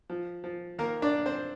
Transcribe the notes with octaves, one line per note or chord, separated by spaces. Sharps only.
F3
F3
D#3 A#3 A#4
D4 D5
A#3
C4 C5